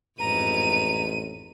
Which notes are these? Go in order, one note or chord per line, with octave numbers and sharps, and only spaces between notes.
A1 F2 G#2 B4 A#5 D#7